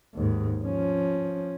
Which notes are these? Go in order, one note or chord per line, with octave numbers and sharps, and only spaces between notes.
D#2 G#2
F3 C#4